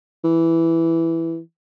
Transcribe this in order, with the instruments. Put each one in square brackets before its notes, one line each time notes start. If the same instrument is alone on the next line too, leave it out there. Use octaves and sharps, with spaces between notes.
[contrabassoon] E3